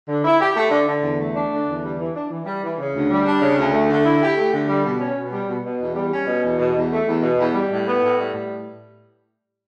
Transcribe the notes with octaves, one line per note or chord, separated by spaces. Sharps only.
D3
E4
G4
A3
D3
D3
E2
A3
D4
D3
E2
G3
E3
D4
E3
G3
E3
C#3
D2
G3
D4
C#3
D2
A3
D3
E4
G4
A3
D3
G3
B2
C#4
B2
G3
B2
B2
E2
G3
C#4
B2
E2
B2
E2
A3
E2
B2
E2
G3
A2
B3
A2
G3
A2